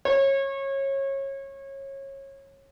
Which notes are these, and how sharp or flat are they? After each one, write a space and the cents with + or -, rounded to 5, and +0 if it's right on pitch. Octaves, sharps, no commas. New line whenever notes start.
C#5 -25